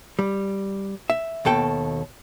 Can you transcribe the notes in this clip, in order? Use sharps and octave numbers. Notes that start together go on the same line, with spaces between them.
G3
E5
D#2 B2 A4 G5